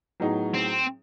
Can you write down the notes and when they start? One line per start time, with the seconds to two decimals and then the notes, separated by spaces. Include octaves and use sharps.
0.20 A2 F#3 B3 D#4 G#4
0.54 C4